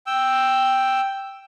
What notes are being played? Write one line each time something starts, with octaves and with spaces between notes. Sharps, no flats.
G5 E6